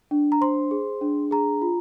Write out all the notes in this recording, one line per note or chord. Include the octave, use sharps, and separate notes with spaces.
D4
A#5
C5 C6
G#4
D4
G#4 A#5
F4